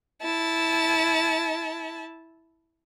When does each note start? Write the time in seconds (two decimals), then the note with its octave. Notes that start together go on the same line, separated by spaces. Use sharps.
0.22 E4 A5